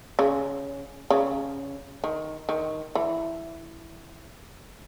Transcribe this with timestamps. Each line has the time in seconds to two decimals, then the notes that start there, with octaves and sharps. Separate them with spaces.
0.19 C#3
1.10 C#3
2.04 D#3
2.49 D#3
2.95 E3